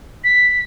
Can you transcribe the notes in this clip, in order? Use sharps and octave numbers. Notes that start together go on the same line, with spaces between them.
B6